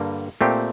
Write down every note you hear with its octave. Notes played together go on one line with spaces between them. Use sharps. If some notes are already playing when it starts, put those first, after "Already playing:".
Already playing: G2 D3 G3 A#3
A#2 A3 C4 G4